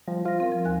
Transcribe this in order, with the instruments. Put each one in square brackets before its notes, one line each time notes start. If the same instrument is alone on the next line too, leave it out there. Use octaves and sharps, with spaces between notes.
[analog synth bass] F3 [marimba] G3
[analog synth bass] F4 [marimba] C5 A#6
[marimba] C4 A#4
F3
D#2 G#5 F#6